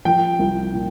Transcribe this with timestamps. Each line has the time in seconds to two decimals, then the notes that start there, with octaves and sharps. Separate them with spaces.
0.05 F3 G5
0.39 C2
0.74 A#2